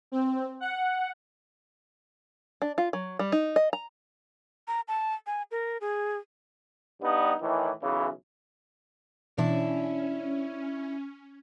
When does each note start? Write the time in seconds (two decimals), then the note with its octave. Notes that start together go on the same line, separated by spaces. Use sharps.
0.12 C4
0.60 F#5
2.62 D4
2.78 F4
2.93 F#3
3.19 G3
3.32 D#4
3.56 D#5
3.73 A#5
4.68 A#5
4.88 A5
5.27 G#5
5.51 A#4
5.81 G#4
7.02 G2 G3 B3 D#4
7.41 A2 D#3 E3
7.83 B1 C#3 E3
9.38 B2 E3 C#4 D4 E4